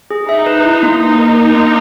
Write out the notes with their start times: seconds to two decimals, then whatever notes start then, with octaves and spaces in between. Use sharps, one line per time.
0.11 G#4
0.28 D#4 E5
0.46 B4
0.65 E4
0.83 A#3
1.00 A#3 D#4
1.18 A#4
1.36 A#4
1.55 A#3